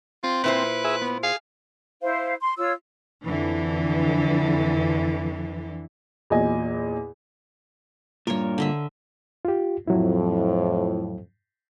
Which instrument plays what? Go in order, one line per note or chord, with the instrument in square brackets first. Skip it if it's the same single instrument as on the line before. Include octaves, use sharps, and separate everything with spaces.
[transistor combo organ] C4 [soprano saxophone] F4
[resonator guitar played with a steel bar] A#2 E4 C5 [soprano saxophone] B4
[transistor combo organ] G#4 E5
B3
[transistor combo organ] G#4 [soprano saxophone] F5
[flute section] E4 C5 F5
C6
F4 C#5 E6
[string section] F2 D3 E3
[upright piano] E2 A#2 F#3 D#5 G#5
[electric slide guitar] G2 A#2 [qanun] A#4 C#5
[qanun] D3 D#5 E5
[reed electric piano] F4 G4
[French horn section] F2 A2 [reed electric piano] F#3 E4